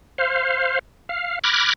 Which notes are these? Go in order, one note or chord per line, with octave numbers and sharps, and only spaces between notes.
C5 F5
F5
B5 D6 F6 F#6 G#6 A#6